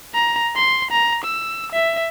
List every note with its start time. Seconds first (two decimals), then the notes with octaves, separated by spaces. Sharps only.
0.14 A#5
0.55 C6
0.91 A#5
1.24 E6
1.72 E5